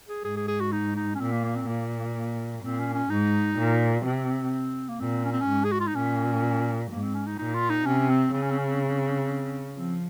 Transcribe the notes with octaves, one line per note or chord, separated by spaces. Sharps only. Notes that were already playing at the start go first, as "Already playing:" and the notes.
G#4
G#2 G#4
G#4
G#4
F#4
D#4
D#4
C#4
A#2 C4
A#3
A#3
C4
A#2 A#3
A#2 C4
C#4
C#4
G#2 D#4
A#2
C3 C4
A#3
A#2 C4
C#4
C4
C#4
G#2
G#4
F#4
F4
D#4
A#2 C#4
G#2 A#3
C4
C#4
D#4
A#2 D#4
F4
D#4
C3 C#4
C4
C#3 C4
C#4
C4
C#4
C4
C4
F3 C4